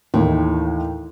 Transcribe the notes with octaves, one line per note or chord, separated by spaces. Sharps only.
D#2 A2 D#3 E3